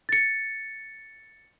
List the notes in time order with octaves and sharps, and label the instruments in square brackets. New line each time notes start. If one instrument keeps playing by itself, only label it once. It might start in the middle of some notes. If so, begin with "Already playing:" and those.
[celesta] A6 C#7